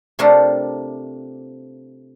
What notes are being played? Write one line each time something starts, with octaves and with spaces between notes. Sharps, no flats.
C3 A3 D4 F4 G4 A#4